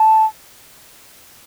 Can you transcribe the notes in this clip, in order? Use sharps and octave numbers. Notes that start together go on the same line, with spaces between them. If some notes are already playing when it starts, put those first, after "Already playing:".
Already playing: A5